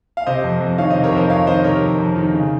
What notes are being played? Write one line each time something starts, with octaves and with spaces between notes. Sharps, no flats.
F5
C3 C5 D#5
F2
F2
D#3 C#5 F5
C5 D#5
C3
A#4 C#5
F2 C5 D#5
F2 C#5 F5
D#3 C5 D#5
D#5
C3 A#4 C#5
F2
F2
D#3
C#3